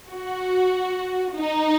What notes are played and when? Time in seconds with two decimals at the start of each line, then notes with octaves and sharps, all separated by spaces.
0.11 F#4
1.35 D#4